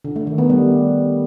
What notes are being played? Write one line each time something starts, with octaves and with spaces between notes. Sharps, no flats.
D3
A3
D#3
B3
G3